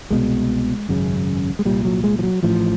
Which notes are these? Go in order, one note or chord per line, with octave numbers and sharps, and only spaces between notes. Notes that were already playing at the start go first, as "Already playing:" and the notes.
C2 B2 G#3
G#1 F#2 C#3
G#3
C2 A#2 G3
F#3
G#3
F3
F#3
A1 A2 F3